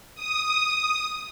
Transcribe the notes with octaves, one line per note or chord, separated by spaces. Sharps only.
D#6